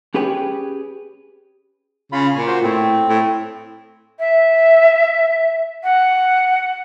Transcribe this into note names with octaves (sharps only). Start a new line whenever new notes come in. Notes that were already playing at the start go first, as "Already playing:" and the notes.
C#4 G4 G#4 B4 C#5 G5
C#3 F4 B5
A#2 C#5 G#5
F#4 C5
A2 C4
A2
E5
F#5